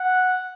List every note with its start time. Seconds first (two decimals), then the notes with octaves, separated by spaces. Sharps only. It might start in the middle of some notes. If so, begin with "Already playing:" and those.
Already playing: F#5